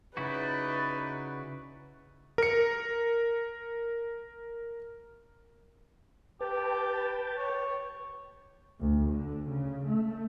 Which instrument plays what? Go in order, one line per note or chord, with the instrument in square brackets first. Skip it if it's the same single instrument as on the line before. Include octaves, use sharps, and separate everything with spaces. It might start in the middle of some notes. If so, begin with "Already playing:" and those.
[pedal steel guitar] C#3 E4 F#4 [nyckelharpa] D#4 D5 [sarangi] B4
[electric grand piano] A#4 C#7
[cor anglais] G4 [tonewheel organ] B4 G5 A5
[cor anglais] C#5
[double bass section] D2
D3
C#3
A3